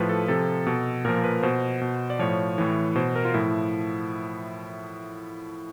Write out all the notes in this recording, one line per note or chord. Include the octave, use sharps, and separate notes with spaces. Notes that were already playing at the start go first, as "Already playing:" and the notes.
Already playing: A2 F3 B4
A4
C3 F3 A4
B2
A#2 F3 A#4
B4
B2 C5
B2
D5
A2 F3 C#5
A2 E3
B2 C5
A#4
F4
A2 F3 E4